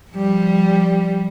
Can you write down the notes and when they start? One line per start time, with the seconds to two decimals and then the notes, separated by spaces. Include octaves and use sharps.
0.11 F3 G3